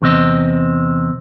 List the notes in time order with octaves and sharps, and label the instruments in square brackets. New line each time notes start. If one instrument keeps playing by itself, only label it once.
[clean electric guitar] E2 C3 C4 D#5